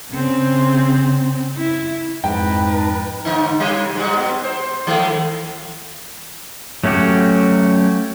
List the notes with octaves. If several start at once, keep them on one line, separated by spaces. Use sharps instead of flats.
C#3 C4
E4
F2 G#2 D#4 B4 G5 A5 A#5
G#2 D3 D#4
C#3 G3 G4
G#2 G3 F#4
B3
C5
D#3 G#3 A3
F#3 A3 C#4 F#4 G4